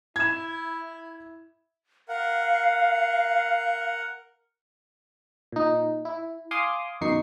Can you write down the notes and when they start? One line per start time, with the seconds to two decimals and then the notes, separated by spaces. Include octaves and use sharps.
0.16 E4 G#6 E7
2.09 A#4 F5 F#5
5.52 A#2 D#4
6.05 E4
6.51 F5 G#5 C6 D6 D#6
7.01 F#2 B2 D#3 D#4 C#6 C7